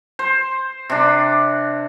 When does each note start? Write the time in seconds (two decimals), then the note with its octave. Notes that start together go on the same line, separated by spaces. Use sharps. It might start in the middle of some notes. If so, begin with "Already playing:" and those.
0.19 C5
0.90 C3 D4